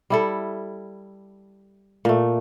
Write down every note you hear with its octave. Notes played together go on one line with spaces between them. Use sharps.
G3 E4 A4
A#2 A3